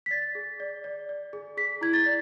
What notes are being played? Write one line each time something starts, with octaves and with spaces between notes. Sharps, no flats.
B6
D5 A6
G#4
D5
D5
D5
G#4
G#4 B6
E4 G#6
A6
D5